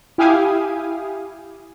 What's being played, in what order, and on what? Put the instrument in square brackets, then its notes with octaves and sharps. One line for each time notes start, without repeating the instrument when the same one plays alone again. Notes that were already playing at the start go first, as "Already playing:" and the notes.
[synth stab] E4 G4 F5 G#5 D#6